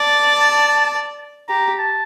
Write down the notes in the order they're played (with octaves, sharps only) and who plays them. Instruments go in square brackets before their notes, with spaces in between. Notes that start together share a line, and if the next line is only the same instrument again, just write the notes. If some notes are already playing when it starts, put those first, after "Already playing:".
Already playing: [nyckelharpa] D5 [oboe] A5
[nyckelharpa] G4 [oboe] A#5
[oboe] A5